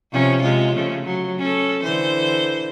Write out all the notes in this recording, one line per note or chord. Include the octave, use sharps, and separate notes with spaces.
C3 F3 C#4
C3 G#3 F4
C#3 F3 A3
F#3
C#4 A4
D3 E3 C5